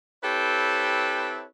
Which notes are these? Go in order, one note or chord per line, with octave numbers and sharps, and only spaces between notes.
C4 E4 G4 A4 B4 C#5